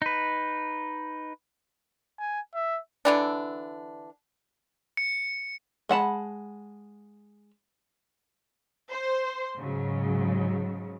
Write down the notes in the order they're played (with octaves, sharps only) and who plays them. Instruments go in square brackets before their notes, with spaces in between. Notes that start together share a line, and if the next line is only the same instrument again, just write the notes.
[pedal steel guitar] D#4 B4
[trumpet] G#5
E5
[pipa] D3 E3 D4
[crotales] C#7
[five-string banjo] G#3 F#5 A5 B5
[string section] C5 C6
G#2 C#3 F#3